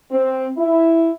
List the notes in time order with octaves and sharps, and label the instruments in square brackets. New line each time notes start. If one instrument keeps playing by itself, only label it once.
[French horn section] C4
E4